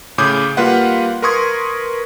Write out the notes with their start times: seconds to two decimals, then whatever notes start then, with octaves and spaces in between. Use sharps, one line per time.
0.18 A2 C#3 G#4 D6 D#6 G6
0.57 G3 A#3 F4 B4 F5 F#5
1.22 A#4 B4 C6 C#6 D#6 G#6